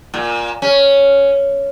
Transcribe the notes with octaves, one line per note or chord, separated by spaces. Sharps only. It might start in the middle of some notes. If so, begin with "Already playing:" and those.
A#2
C#4